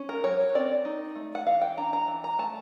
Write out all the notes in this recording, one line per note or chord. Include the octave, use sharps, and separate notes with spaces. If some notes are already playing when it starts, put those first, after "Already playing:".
Already playing: C#4
A#4
F#3 C#5
C4 D5
D#4
A3
F#5
E3 F5
G5
D4 A#5
A#5
E3
A#5
A3 A5